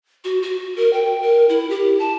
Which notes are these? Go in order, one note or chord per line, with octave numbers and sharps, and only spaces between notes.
F#4
F#4
A#4
G5
A#4
E4
G4
A5